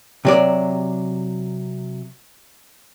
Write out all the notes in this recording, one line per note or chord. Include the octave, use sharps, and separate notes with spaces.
C3 F#3 D5